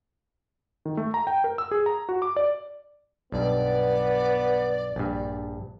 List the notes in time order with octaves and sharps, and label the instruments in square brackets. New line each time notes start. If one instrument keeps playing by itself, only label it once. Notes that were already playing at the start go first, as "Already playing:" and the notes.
[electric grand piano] D#3
A3
A#5
G5
A#4
E6
G#4
A#5
F#4
D6
D5
[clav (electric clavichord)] B1 G2 [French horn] B3 [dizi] D5
[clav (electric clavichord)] A#1 G2